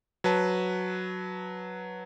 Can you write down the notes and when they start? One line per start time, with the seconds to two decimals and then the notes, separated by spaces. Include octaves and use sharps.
0.24 F#3 B4 A5